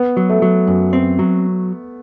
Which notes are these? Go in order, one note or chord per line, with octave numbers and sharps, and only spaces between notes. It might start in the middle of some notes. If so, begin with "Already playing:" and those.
Already playing: B3
F#3
A3
F#3
F#2
C4
F#3